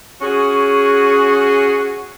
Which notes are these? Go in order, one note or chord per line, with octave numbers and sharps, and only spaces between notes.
C#4 F#4 G#4